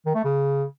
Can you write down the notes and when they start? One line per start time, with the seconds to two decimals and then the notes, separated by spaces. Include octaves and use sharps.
0.06 D#3
0.15 A3
0.24 C#3